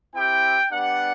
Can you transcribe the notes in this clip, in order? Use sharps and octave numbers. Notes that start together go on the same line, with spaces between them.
C4 E4 G4 G5
G3 B3 D4 G4 F#5